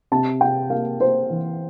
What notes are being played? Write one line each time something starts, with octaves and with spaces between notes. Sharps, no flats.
C3 A5
C3 G5
A#3 F5
A#3 C5
E3